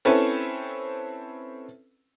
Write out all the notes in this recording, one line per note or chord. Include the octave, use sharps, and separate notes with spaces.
C4 C#4 E4 A4 B4